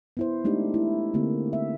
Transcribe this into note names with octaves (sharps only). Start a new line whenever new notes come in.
B3 E4 C5
G#3 A3 D4 D#4 G4
E4
D3 A3 A#3 C4 G4
E5